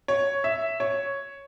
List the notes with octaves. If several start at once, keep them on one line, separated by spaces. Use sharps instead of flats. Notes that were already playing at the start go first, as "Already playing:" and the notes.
C#5
E5
C#5